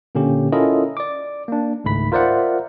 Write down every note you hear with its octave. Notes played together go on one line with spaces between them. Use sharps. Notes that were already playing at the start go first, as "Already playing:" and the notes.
A#2 D3 A#3 C#4 G4
C#4 E4 F4 A4 A#4 D#5
D5 D6
A#3 D4
G#1 C#2 G#2 A3 B5 B6
F4 A#4 C5 D5 E5 F#5